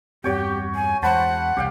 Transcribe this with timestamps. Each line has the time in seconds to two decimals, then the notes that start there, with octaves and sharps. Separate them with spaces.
0.24 E2 G2 C4 F#4 G4 C#5 G5
0.75 G#5
1.02 E2 G#3 C5 F#5 A5 B5
1.57 E1 C2 C#4 G4 F5 G5